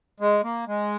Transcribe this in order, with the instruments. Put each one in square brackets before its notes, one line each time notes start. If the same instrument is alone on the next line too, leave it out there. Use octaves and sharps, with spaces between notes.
[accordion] G#3
A#3
G#3